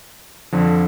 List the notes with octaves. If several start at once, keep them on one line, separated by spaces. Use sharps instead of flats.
F2 D3 F3